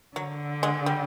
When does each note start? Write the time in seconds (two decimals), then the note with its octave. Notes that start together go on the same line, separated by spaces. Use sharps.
0.16 D3 F#3
0.63 G#3
0.86 G3